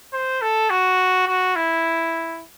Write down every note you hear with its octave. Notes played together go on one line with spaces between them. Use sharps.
C5
A4
F#4
F#4
E4